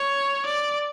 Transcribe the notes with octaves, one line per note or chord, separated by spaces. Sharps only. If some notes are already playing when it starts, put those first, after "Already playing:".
Already playing: C#5
D5